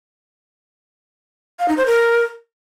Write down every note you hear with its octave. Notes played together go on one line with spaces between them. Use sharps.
F5
D#4
C5
A#4